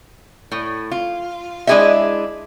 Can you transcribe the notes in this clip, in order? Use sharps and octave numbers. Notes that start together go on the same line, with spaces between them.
A2
F4
G#3 D4 E4 G#4 D#5 E5